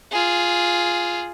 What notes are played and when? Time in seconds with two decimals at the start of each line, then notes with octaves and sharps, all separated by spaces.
0.12 F4 G#4